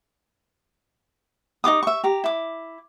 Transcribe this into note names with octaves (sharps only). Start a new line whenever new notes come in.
D#4 F4 D6 D#6
E5 C#6
G4 A#5
E4 D6